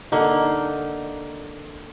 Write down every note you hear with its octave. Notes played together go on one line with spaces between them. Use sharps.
D3 A#3 D#4